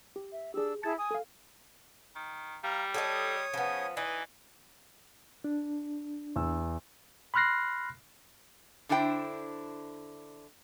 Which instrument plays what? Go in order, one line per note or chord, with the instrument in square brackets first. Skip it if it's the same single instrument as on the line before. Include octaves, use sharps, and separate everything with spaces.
[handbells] G4
[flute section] E5
[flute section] D4 E6 [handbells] G4 G#4
[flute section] E4 G#4 A5 [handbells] G#6 A6 C#7
[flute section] G#5 D#6
[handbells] A4 F5
[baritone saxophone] D#3
[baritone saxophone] G3 [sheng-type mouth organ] F5 A#5
[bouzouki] D#4 F#4 A4 [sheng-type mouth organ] C#5 D#6
[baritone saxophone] C#3 [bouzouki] F3 B3
[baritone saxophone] E3 [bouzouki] D#4
[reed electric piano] D4
[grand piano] E2 E6
[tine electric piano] B5 C6 F6 F#6 A#6 C7
[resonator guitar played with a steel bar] D3 D4 E4 C5 G5